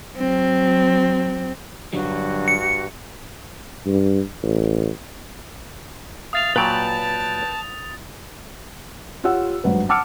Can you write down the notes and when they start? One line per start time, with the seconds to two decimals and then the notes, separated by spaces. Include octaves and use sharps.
0.17 F#3 C4
1.93 G2 D3 F#3 G3 F#4
2.48 C#7
3.86 G2
4.43 A1
6.33 E5 F5 D#6 A6 F7
6.56 A#2 F#3 B4 G5 A5 B5
9.24 F4 G4 C#5 F#5 E6
9.64 G#1 G2 F#3 B4
9.89 F#5 A5 D6 E6 F6 C#7